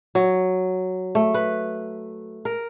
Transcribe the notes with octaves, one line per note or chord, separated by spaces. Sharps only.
F#3
A3
B4
A#4